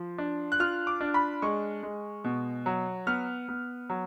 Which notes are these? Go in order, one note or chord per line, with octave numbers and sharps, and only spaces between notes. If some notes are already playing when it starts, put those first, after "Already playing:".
Already playing: F3
D4
F#6
F4 F6
D6
D4
B5
G#3 C#6
G#3
B2
F#3
B3 F6
B3
F#3